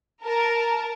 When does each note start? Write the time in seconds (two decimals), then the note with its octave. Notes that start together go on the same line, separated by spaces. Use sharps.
0.24 A#4 A5